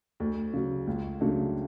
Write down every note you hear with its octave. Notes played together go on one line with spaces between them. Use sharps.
D2
C#3 F#3
C#2
C#3 F#3 A3 D4